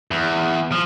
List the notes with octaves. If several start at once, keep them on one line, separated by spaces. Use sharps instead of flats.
E2
F3